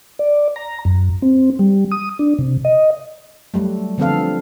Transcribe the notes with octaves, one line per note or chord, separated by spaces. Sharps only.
D5
A#5
F#2
C4
G3
D#6
D4
C3
D#5
F#3 G3 A3
D3 F3 B3 C4 A4 F5